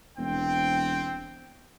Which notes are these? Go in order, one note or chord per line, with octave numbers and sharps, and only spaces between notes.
E1 C4 G5